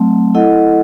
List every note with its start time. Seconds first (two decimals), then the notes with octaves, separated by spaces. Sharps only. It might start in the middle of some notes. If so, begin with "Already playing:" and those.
Already playing: F#3 A3 C4
0.34 E4 A4 D#5 F#5